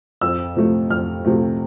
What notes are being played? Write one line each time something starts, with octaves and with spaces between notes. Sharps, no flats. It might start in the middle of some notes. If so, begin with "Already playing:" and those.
F2 E6
C3 F3 A3
F2 F6
C3 F3 A3